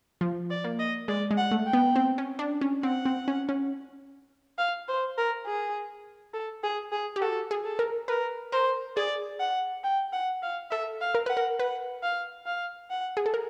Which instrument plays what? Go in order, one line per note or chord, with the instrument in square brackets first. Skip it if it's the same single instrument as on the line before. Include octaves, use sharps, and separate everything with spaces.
[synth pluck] F3
[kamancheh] D5
[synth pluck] A#3
[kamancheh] D#5
[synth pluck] G#3 [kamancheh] D5
[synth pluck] G#3
[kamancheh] F#5
[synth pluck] A3
[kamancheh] G5
[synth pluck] B3
C4
C#4
D4
C#4
[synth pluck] C4 [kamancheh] F#5
[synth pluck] C4
C#4
C#4
[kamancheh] F5
C5
A#4
G#4
A4
G#4
G#4
[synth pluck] G4
[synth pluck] F#4 [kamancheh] A4
[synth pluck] G#4
[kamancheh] A4
[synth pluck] A#4
[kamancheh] A#4 [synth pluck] B4
[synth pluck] A#4 [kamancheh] C5
[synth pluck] G#4 [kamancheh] D5
[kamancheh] F#5
G5
F#5
F5
[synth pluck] A4 [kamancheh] E5
[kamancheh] F5
[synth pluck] A#4
[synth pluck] B4 [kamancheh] F#5
[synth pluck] A#4
[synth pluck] B4 [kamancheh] F#5
[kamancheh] F5
F5
F#5
[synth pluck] G#4
A4
A#4